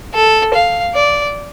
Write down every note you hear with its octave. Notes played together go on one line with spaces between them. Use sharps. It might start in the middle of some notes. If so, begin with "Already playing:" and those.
A4
F5
D5